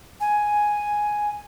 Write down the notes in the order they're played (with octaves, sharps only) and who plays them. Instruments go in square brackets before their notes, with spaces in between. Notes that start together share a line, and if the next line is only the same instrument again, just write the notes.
[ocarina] G#5